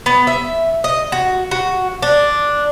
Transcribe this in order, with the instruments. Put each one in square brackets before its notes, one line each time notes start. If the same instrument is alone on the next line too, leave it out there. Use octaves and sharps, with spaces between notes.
[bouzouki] B3
E5
D#5
F#4
F#4
D4